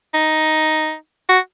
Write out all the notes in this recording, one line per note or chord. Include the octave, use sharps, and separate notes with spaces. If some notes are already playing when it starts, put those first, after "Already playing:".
D#4
F#4